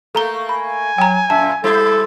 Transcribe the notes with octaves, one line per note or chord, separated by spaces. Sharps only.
A3 A#3 A4 A#5 G7
G#5 B5
F#3 G5 A#5
F#2 A#2 E5 A5
G3 E4 A4 C5